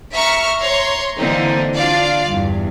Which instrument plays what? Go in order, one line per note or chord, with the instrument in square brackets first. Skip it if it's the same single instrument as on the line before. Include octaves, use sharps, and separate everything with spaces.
[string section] E5 A#5 C#6 F6
C#5 A#5 C6
D3 E3 A#3 C4 D#4
D4 F4 D5 F5
E2 G2